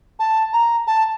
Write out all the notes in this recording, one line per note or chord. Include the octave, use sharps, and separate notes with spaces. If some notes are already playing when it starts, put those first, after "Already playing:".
A5
A#5
A5